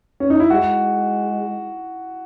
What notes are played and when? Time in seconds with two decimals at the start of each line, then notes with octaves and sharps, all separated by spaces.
0.20 C#4
0.30 D#4
0.40 E4
0.50 G#3 F#4